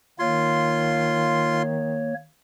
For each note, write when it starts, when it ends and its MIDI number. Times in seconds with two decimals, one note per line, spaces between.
0.19 2.29 51
0.19 2.14 58
0.19 1.62 65
0.19 2.14 73
0.19 1.62 84